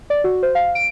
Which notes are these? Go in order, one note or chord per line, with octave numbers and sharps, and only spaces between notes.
D5
F#4
C5
F5
D7